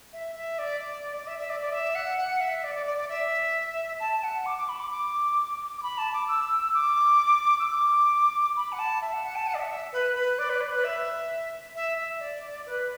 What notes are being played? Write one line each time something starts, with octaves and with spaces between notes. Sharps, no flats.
E5
E5
D5
D5
E5
E5
D5
D5
E5
F#5
F#5
E5
D5
D5
D5
D5
E5
A5
F#5
D6
D6
B5
D6
D6
D6
B5
A5
D6
E6
D6
E6
D6
B5
F#5
A5
E5
F#5
F#5
A5
F#5
D5
E5
E5
B4
B4
D5
B4
D5
B4
E5
E5
E5
D5
B4